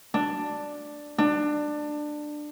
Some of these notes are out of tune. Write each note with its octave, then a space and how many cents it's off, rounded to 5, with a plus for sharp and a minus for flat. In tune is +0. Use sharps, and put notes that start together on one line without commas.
D4 +5
D4 +20